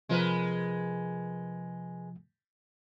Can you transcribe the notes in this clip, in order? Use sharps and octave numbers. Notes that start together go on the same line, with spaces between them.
C3 F3 G#3 A#4 B4